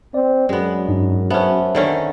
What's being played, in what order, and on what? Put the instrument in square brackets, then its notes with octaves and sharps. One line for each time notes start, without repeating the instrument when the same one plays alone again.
[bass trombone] C4 [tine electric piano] D5
[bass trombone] F#2 [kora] G#3 B3
[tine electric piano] G2 D4 D#4
[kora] B3 C#4 [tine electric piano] C5 E5 A5
[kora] D3 D#3 C#4